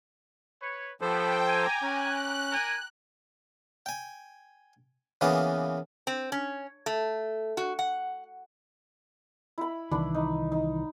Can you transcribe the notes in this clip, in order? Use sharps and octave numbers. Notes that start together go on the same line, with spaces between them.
B4 C#5
F3 B3 G4 A4 C5 G5
G#5 A#5 D6
C#4 F#6
D4 A#4 G#5
G5 G#5
C#3 E3 A#3 B3 D#6
C4
C#4
A3
F#4
F#5
E4 B5
C2 D#3 E3 D4 B5
D#4
D#4